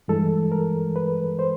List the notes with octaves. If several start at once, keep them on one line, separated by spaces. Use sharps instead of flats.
G2 E3 G#3 A4
A#4
B4
C5